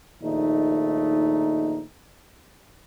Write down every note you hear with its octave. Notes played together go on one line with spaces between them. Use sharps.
A#1 D#2 A3 D#4